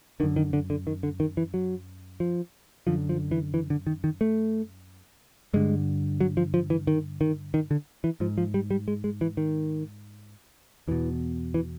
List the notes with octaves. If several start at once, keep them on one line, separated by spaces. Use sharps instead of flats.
F#2 D3 D#3
D#3
D3
D3
D#3
D3
D#3
E3
F#3
F3
F#2 D3 F3
F3
E3
E3
D3
D#3
D#3
A3
G2 D3 G#3
F#3
F3
F3
E3
D#3
D#3
D#3
D3
E3
G#2 F3
F3
G3
G3
G#3
G#3
E3
D#3
E2 B2 E3
E3